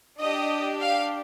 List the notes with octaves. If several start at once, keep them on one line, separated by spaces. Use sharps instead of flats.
D4 G4 D#5
F5